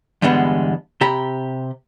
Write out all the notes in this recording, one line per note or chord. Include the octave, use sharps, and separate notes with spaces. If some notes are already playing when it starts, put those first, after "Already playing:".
E2 G2 D3 G3 G#3 B3
C3 G4 A#5 B5